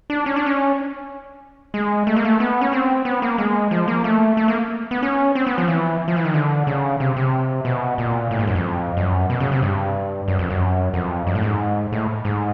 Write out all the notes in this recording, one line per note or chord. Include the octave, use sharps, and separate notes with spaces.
D4
C#4
D4
C#4
G#3
A3
A#3
A3
B3
C#4
C4
B3
A#3
G#3
F3
A#3
A3
A3
A#3
B3
C#4
C4
B3
F3
E3
F3
E3
D#3
D3
C#3
C3
C3
B2
A#2
A2
G#2
F#2
F2
F#2
B2
C#3
C3
G2
F#2
F2
F#2
F2
F#2
A2
G#2
A2
G#2